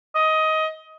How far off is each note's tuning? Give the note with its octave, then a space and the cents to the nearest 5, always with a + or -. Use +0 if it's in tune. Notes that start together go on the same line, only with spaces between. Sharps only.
D#5 +15